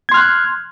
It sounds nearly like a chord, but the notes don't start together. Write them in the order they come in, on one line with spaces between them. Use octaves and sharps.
G#6 C6 F6 F#6